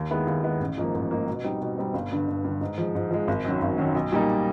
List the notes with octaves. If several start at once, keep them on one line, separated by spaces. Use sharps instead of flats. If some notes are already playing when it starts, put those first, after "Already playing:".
Already playing: D#2
D#3 G#3 B3 E4
D#2
D#3 G#3 B3 E4
A1
G#2 F3 A#3
A1
G#2 F3 A#3
B2
G3 C4 D#4
B2
G3 C4 D#4
G1
G2 D3
G1
G2 D3
G#2
F3 G#3
G#2
F3 G#3
G#1
F#2 D#3 F#3
G#1
F#2 D#3 F#3
B1
A#2 G3 A#3 D#4